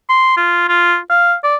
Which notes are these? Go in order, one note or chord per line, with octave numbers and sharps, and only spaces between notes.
C6
F4
F4
F5
D5